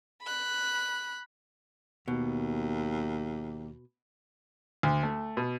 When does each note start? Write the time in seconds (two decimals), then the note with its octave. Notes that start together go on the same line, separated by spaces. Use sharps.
0.22 B5 F#6
2.08 D#2 B2
4.83 D2
5.03 A3
5.37 B2